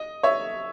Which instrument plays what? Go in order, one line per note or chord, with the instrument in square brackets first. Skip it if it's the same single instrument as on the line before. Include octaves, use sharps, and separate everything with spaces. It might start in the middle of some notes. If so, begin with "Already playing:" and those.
Already playing: [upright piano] D#5
C#5 E5